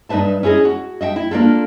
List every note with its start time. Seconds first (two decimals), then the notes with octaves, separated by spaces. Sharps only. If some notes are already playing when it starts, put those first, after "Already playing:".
0.09 G2 D#4 B4 C5 E5 A5
0.43 C#4 E4 G#4 D#5
0.65 F#4
1.01 D#5 E5 F#5 G5
1.16 E4
1.31 A#3 D4 F4 A4